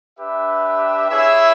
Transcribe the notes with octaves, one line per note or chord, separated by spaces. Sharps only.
D4 G4 B4 E5
E4 G#4 C#5 E5